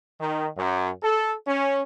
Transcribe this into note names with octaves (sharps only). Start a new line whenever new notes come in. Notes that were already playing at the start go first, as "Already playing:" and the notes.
D#3
F#2
A4
C#4